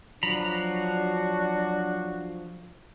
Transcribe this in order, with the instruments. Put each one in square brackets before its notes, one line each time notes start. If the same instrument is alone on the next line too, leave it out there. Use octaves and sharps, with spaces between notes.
[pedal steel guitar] F3 A#5 B5 [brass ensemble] F#3 D4 F#4